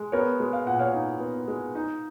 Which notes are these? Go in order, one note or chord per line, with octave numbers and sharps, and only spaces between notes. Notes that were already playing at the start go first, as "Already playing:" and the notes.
Already playing: G#3
B3 A#4 C#5
G#3
F5
A#2 F#5
C#5 F5
D#4
B3
G#3
D#4